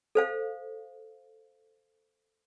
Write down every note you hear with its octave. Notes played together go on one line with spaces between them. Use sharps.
A4 C5 F5